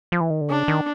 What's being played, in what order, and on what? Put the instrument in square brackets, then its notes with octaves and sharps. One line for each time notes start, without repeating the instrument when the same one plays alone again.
[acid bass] F3
E3
D#3
D3
[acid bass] C#3 [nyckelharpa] D4
[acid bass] D#3